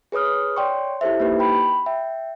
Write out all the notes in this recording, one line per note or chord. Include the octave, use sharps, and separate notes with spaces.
G#4 B4 C#5 D#6 F6
C#5 D5 G5 C6 C#6
E4 G4 A4 C5 E5
A#3 D#4 G4 B4
G5 B5
E5 G5